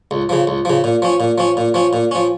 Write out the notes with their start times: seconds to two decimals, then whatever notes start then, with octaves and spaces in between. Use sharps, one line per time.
0.11 C#2
0.29 C#3 F3
0.47 C#2
0.65 C#3 F3
0.84 A#2
1.02 F3 C#4
1.20 A#2
1.38 F3 C#4
1.57 A#2
1.74 F3 C#4
1.93 A#2
2.11 F3 C#4